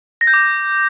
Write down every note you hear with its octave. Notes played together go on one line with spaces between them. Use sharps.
A#6
G6
D6